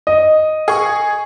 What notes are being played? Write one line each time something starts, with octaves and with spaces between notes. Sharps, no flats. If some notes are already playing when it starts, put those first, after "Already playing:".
D#5
G#4 C#6